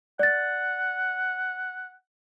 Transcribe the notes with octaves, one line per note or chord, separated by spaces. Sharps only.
D5 F#5 A6